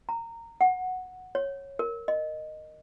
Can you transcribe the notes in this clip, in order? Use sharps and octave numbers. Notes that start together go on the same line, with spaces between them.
A#5
F#5
C#5
A#4
D#5